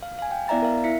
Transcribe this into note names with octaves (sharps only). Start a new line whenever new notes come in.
F5
F5 G#5
G5
B3 E4 D5 E5 A#5 A6
A#4 F5
E4 E5 B6 C#7